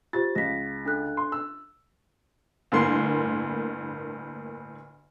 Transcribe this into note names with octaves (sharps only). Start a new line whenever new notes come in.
F4 G4 C5 A6
C#2 A#6 B6
D4 A4 F#6
C6
E6
G1 D2 A2 A#3 C6 C7